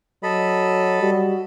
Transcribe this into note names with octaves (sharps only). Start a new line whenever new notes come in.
F#3 A4 D#5 B5
G3 F#4